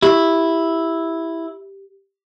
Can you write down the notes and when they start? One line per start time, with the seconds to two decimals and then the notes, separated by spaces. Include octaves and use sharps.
0.02 E4 G4